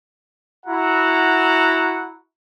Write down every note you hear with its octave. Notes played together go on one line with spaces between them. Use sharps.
E4 F#4 F#5 A#5